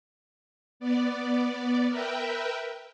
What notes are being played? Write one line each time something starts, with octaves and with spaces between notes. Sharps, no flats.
B3 D5
A#4 B4 E5 G5